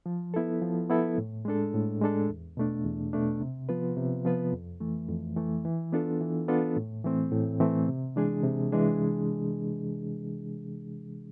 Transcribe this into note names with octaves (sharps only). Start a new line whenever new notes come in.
F3
B3 E4 A4
F3
B3 E4 A4
A2
G#3 D4 A4
A2
G#3 D4 A4
E2
B2 A3 D4
E2
B2 A3 D4
C3
F3 B3 F4 B4
C3
F3 B3 F4 B4
F2
E3 A3
F2
E3 A3
E3
B3 D4 F4 A4
E3
B3 D4 F4 A4
A2
E3 A3 C4
A2
E3 A3 C4
C3
E3 G#3 D4 G#4
C3
E3 G#3 D4 G#4